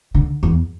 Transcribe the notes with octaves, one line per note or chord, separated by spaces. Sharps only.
D3
E2